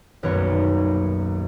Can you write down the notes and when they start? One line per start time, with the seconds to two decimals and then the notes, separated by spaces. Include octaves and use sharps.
0.23 D#1 B1 F#2 D#3 B3 C#5